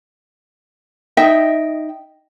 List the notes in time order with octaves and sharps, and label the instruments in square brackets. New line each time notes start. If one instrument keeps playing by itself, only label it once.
[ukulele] D#4 D#5 E5 G5